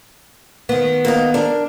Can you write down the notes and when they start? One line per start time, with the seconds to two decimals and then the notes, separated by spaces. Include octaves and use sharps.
0.69 D#3 B3
1.05 A#3 D#4
1.34 D4 A#4